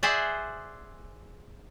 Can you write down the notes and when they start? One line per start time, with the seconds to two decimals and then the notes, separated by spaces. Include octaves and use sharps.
0.03 G#4 C5 D5 E5 F#5 G#5